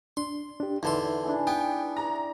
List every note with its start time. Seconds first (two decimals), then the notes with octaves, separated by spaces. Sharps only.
0.17 D4 C6
0.60 D4 G4
0.83 E2 D3 D#4 B4 E5 C6
1.23 D4 E4 G#4
1.47 B3 G5
1.97 A#5